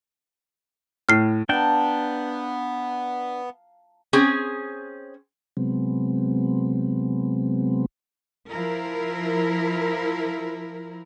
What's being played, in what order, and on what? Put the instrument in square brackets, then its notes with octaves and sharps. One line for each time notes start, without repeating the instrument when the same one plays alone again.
[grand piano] A2 [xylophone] F6 C7
[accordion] B3 [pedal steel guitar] D4 G5 [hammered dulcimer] F5 A5 A#5
[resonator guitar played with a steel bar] C4 C#4 G#4
[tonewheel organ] C3 F#3 G#3 B3 C4
[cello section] F3 E4 A#4